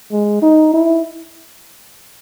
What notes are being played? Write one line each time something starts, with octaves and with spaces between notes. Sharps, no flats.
G#3
D#4
E4